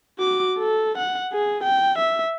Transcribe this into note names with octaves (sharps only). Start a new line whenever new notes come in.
F#4 D6
A4
F#5
G#4
G5
E5